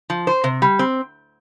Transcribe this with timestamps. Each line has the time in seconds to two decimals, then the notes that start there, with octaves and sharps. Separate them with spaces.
0.10 F3
0.27 C5
0.44 C3
0.62 G3
0.79 C4